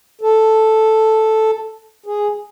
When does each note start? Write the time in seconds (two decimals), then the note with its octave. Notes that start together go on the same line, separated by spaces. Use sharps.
0.21 A4
2.06 G#4